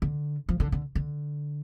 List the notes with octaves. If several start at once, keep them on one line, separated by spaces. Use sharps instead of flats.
D3
F3
D3
D3
D3